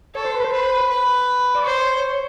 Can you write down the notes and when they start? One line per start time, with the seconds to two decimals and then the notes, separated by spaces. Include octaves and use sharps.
0.15 A4 C#5
0.25 C5
0.34 B4
0.44 C5
0.52 B4
0.89 B4
1.55 D5
1.64 C5 C#5